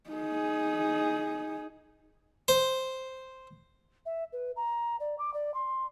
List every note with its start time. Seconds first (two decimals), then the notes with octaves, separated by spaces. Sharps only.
0.10 D#4 G#4
2.48 C5
4.06 E5
4.33 B4
4.56 A#5
5.00 D5
5.19 D6
5.34 D5
5.54 C6